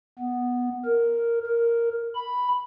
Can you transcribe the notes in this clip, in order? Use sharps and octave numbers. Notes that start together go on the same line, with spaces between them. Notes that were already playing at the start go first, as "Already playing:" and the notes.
B3
A#4
A#4
B5